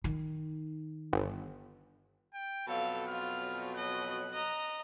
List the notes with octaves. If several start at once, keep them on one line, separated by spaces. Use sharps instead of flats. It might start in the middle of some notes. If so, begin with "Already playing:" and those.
D#3 D#4
G1
G5
F2 B2 F#3 A4 F5
F4 F6
D#5 F#6
D#5 A#5